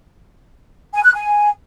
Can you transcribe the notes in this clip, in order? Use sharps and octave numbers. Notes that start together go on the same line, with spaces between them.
G#5
F#6
G#5